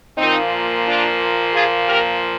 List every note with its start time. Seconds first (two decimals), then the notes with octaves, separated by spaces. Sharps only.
0.18 A#2 F3 A#3 C4 D#4
0.86 D4 F4
1.54 F4 G#4
1.87 G4 A#4